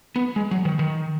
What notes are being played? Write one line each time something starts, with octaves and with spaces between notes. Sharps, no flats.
B3
G#3
F#3
D#3
D#3